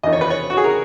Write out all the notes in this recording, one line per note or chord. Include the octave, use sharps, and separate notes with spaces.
E2 D#3 D#5
C#5
B4
C#5
F#4
G#4
A#4